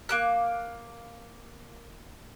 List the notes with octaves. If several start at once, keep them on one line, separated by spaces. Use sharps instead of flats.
A#3 D6 F#6